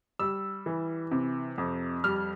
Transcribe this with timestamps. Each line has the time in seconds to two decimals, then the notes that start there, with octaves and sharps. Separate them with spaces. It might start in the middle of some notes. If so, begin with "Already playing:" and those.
0.19 G3 E6
0.66 E3
1.11 C3
1.58 F2
2.04 G3 F6